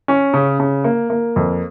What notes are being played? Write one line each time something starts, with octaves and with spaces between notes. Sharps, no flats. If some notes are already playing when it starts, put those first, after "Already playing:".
C#4
C#3
C#3
A#3
A#3
F2